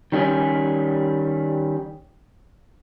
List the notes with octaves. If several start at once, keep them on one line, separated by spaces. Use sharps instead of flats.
D#3 G3 C#4 G#4